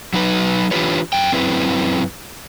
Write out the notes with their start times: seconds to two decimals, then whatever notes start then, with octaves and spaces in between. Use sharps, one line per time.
0.13 F#3 D#4 B4
0.71 E3 D4 F4 G4 B4 C#5
1.13 F#2 G5
1.32 F#2 C4 E4 B4